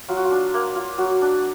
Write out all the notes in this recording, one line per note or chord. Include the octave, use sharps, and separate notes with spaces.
F#3 F4
F#4
F4
D4
A#3
F4
F#3 F#4
D4